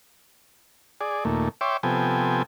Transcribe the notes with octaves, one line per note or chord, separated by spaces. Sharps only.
G#4 D5
D#2 A#2 A3
C#5 E5 G5 C6 D6
C3 F3 B3 A4 G5 G#5